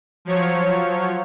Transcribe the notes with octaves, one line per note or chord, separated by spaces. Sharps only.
F3 F#3 C#5